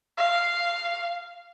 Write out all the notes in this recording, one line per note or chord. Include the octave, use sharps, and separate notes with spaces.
F5